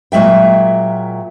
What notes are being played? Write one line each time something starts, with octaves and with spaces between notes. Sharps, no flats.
A#2 F#3 G#3 E5 G5